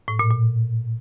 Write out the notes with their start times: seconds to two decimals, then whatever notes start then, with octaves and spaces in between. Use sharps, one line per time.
0.08 A2
0.19 A#2
0.31 A#2